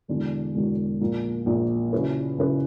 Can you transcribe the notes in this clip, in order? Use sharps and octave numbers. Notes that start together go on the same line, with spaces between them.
E1 E2 D3 F#3
E1 E2 D3 F#3
A#1 A#2 A#3
A#1 A#2 A#3
C#3 F#3 C#4 E4 B4
C#3 F#3 C#4 E4 B4